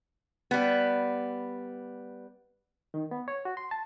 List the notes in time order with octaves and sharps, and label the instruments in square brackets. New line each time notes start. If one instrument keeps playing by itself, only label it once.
[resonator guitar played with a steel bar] G3 B3
[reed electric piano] D#3
B3
C#5
F#4
C6
A5